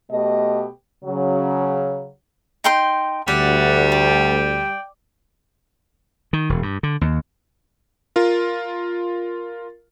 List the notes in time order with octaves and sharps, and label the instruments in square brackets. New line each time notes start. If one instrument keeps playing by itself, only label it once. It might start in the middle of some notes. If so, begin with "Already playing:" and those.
[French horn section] B2 A3 G4 D#5
C#3 F#3
[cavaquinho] D#4 G5 C6
[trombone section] D2 [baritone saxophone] G3 [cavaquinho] D5 [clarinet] F#5
[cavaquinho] D5 [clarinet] G5
[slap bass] D#3
E1
G2
D3
D#2
[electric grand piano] F4 A#4